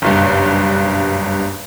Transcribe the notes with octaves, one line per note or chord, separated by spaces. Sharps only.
F#1 B1 G2